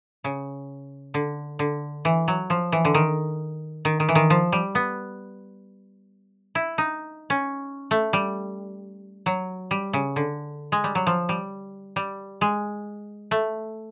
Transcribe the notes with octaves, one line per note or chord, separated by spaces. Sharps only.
C#3
D3
D3
E3
F#3
F3
E3
D3
D#3
D#3
D#3
E3
D#3
F3
G3
B3
E4
D#4
C#4
A3
G3
F#3
G3
C#3
D3
G#3
G3
F#3
F3
G3
G3
G#3
A3